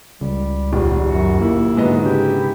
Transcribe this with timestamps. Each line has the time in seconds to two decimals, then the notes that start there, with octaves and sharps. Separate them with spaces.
0.21 C#2 G3
0.73 D#1 E2
1.09 F#2 F#3 F#4
1.41 A#2 A#3 E4
1.77 G#2 D3 F#3 B3 D#5
2.05 C#3 E4 G4